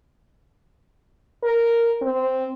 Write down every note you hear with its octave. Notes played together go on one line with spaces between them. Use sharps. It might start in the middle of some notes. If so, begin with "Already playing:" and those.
A#4
C4